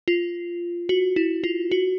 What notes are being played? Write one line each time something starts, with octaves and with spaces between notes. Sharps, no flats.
F4
F#4
E4
F4
F#4